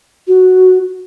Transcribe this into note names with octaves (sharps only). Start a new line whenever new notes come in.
F#4